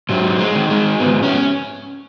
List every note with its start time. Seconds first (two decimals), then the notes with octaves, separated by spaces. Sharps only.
0.09 G#2 F#3
0.39 G#3
0.55 D#3
0.70 G#3
0.99 G#2 B3
1.23 C#4